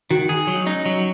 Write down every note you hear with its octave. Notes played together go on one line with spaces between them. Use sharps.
D#3 F#4
G#4
F#3
D#4
C#4 D#4
F#3